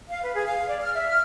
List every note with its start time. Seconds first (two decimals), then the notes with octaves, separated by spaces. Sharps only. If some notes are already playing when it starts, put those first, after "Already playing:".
0.09 F5
0.23 B4
0.34 G#4
0.47 F5
0.68 D5
0.81 F6
0.93 E5
1.08 F6